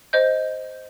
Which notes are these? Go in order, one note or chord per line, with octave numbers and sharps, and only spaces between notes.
C5 D#5 G6